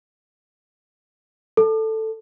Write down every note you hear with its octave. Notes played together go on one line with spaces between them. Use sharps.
A4